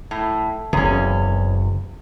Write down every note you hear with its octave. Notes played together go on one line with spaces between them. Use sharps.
A2
F#1 E2 C3 C#4